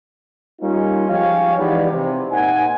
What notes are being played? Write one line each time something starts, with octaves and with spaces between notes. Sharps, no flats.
G3 A#3 C#4 D#4 F4
F3 G#3 C#4 G4 C#5 F5
E3 G#3 B3 D#4 G4 D5
C3
A#2 A#3 C4 D#4 F#5 G#5